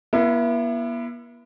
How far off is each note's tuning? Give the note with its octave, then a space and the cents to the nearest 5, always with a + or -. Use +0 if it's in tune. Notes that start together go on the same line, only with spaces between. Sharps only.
B3 -45 E4 +25